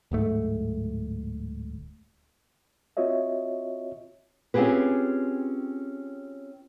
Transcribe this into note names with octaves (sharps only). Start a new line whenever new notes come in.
D1 G#2 A3
C4 F4 F#4 C#5 D#5 E5
C4 C#4 F4 G4 G#4 B4